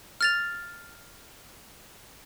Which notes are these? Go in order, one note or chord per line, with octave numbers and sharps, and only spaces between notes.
F6 A6 F7